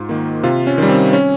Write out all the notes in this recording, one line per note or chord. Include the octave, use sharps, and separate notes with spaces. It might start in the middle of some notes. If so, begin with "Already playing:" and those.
Already playing: G#2 F4
D#3 A#3
C3 F4
C#4
D#3 G3
C4
C#4